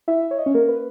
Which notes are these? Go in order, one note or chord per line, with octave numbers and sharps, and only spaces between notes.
E4 E5
C#5
D#5
C#4 C#5
A#3 A#4
B4